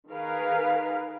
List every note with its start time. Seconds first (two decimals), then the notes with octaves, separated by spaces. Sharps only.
0.11 D#3 G#4 A#4 B4 F5